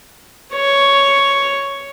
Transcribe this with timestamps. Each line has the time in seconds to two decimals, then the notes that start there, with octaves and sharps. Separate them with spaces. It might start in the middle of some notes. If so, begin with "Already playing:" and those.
0.54 C#5